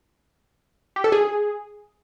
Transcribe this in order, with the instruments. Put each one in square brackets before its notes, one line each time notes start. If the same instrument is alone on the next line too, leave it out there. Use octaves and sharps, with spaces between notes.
[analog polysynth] G4
A4
G#4